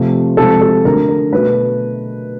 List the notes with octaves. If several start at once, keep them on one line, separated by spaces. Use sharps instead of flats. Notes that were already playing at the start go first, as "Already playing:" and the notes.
Already playing: C3 F3 A3
C3 F3 G#3 A4
A4
D3 F#3 A3 A#4
A#4
B2 F#3 A3 B4